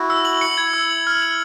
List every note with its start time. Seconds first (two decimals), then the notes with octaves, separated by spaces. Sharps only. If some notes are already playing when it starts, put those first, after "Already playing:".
Already playing: E4 F#4
0.10 E6
0.25 F#7
0.41 C#7
0.58 E4 G#6
0.74 E6
0.90 F#7
1.07 F6
1.22 F#7